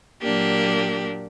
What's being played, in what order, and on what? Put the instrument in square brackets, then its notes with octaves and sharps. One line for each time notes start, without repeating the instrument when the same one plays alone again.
[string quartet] A#2 F#3 A#3 D4 G4